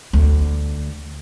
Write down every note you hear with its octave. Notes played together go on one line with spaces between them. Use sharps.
D2